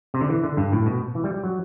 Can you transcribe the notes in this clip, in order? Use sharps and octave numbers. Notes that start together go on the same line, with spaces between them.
C3
D3
E3
D3
G2
A2
B2
E3
G3
G3
F#3